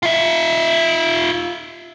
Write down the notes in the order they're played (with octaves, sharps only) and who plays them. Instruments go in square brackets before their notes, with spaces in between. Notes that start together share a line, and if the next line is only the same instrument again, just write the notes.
[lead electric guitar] F4 E5